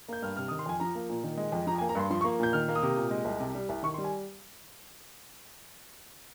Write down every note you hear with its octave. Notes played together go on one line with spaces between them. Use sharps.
A#3 G6
G2 F6
C3 F6
D#6
D#3
C6
F2 G#5
F3 A#5
A#3
A#2
D#3
G#3
F2
F3 A#5
G#5
A#3
A#5
G2 C6
F3 C6
C#6
A#3
A#2 G6
D#3 F6
A#3
D#6
C3
A#2
G#3
C2
C3
G3
C2
D#3 C#6
C6
G3
G#5